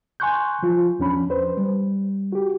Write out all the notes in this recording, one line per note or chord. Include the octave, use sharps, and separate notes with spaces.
G#5 C6 C#6 F#6 G6
F3 F4
E2 F3 C#4 D4 B5
B4 C5
G3
F#4 G4